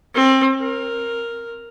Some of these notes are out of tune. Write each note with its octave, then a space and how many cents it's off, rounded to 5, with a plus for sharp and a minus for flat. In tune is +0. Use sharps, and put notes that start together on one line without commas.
C4 +25
A#4 +0